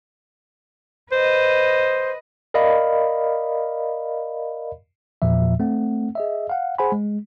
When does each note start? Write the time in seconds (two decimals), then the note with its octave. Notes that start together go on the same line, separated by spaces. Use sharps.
1.12 B4 C5 D#5
2.54 A#4 D5 D#5 F5 B5
5.22 E2 A#2 F3 E5
5.60 A3 C4 F#5
6.15 G#4 D#5 E5
6.50 F5 F#5
6.78 G#4 C5 F#5 G#5 B5
6.92 G#3